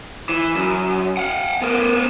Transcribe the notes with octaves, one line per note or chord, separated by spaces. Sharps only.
E3
F#2
F5 F#5
B3 A#4